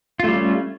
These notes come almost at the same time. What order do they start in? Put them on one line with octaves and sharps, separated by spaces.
F4 A3 G3 C#4